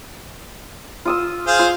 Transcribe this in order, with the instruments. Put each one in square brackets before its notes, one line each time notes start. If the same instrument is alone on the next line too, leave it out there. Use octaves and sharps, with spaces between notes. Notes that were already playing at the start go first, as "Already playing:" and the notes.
[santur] F4 D#6 E6
[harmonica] G#4 C5 F5
[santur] F4